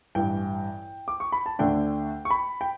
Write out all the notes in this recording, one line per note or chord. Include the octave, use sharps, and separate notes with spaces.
A1 G2 E3 G5
D6
C#6
B5
A5
D2 D3 A3 D4 G5
C#6
B5
G5